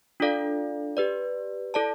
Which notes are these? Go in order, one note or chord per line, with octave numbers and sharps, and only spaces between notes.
D4 F4 A4 D5 F5
G4 B4 D5
E4 A4 D5 A5